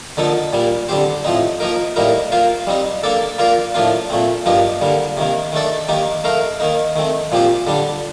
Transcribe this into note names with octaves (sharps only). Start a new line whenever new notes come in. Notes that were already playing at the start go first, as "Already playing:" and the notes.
D3 F3 A#3 D#4 A4
A#2 G3 A#3
D3 G3 C4 G4 C5
A2 F3 C4 D#4
F3 A#3 D#4 A#4
A2 G3 A#3 D#4 A#4
A#3 F4 C5
G3 C4 D#4
A#3 D4 A4 D5
A#3 F4 A#4 D5 F5
A2 F3 A#3 D4 F4
A#2 A3 C4
G2 F3 A#3 D#4 G4
D3 G3 A#3
C3 D#3 A#3
D#3 A3 D4 A4 D5
D#3 A#3 D#4 G4
A3 D#4 A#4 F5
D#3 A#3 D#4
D#3 A3 C4
A#2 F3 C4 G4 C5
D3 G3 D4